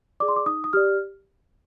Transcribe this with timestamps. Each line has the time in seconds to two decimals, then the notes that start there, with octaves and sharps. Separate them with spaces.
0.20 G#4 D5 D6
0.28 C6
0.36 D6
0.46 D#4 D#6
0.64 D#6
0.73 G4 D5 F6